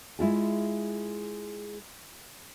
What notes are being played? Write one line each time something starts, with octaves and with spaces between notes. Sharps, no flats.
G#3 E4 F4 G#4